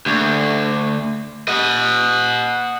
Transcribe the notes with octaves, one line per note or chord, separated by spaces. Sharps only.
D2
D#5 F#5